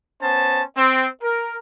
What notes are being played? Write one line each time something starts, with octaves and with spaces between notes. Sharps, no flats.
B3 C#4 C5 A5
C4
A#4